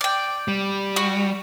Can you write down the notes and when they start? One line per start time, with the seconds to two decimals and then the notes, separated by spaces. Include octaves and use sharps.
0.01 D5 G5
0.48 G3
0.96 F#4